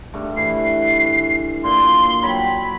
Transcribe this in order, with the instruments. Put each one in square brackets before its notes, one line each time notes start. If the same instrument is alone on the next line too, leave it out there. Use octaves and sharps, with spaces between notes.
[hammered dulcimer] G2 A3
[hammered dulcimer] E3 [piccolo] C7
[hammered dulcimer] A#2 [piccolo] C6
[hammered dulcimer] F#3 C4 [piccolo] B5